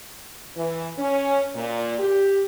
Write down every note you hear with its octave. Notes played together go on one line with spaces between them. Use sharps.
E3
C#4
A#2
G4